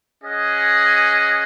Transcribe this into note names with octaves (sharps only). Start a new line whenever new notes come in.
C#4 G#4 D#5 F#5